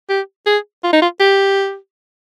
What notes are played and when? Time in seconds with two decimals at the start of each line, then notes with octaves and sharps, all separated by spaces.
0.10 G4
0.46 G#4
0.84 F4
0.93 D#4
1.02 F4
1.20 G4